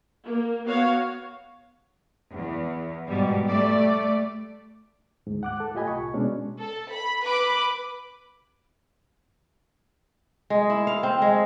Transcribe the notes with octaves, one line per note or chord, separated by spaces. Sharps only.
A#3
B3 F#4 C#5 F5
E2
G#2 B2 G3
G3 A3 D5
D2 G#2
F#5 D6 F#6
A4
A2 F4 G4 D#5 G#5 B5
C2 C#6
B2 G#3 C#4 D4
A4
B5
B4 B5 D6
G#3
E4
F5
C4
G#3